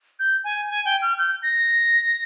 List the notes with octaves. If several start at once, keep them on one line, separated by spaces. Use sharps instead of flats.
G6
G#5
G#5
G5
F6
G6
A#6